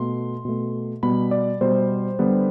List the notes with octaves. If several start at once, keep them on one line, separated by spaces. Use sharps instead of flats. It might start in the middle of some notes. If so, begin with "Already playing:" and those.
Already playing: B2 A3 C6
B2 A3
B2 G3 B3 B5
D5
B2 G3 B3 C5
D3 G3 B3